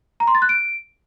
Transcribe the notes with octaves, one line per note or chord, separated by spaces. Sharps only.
A#5
C6
A6
F#6
D7